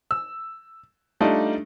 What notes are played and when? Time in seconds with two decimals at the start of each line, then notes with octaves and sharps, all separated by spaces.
0.11 E6
1.20 G3 A3 D4 D#4 F4